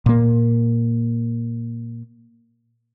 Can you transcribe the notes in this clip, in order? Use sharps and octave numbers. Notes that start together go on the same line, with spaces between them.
A#2 A#3